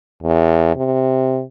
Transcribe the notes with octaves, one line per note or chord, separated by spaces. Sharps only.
E2
C3